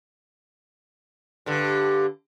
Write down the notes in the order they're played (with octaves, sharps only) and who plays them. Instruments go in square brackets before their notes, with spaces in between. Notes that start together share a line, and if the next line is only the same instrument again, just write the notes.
[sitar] G2 D3